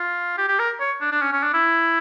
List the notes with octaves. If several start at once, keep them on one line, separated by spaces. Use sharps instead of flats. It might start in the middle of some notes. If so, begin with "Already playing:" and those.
Already playing: F4
G4
G4
A#4
C#5
D4
D4
C#4
C#4
D4
E4